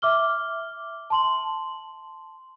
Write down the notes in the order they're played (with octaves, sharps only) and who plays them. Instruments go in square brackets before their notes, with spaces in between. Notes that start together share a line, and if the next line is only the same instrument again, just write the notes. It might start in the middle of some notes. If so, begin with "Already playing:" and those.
[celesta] E5 D6 F6 G7
A5 C6 F#7